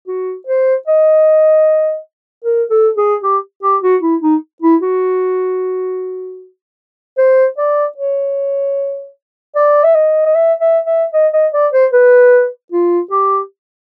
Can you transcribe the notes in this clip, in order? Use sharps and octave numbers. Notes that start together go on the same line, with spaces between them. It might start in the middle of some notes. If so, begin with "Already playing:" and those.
F#4
C5
D#5
A#4
A4
G#4
G4
G4
F#4
E4
D#4
E4
F#4
C5
D5
C#5
D5
E5
D#5
D#5
E5
E5
E5
D#5
D#5
D5
C5
B4
F4
G4